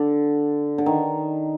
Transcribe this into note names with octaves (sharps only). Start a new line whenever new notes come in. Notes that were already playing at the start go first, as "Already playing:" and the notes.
Already playing: D3
D3
D#3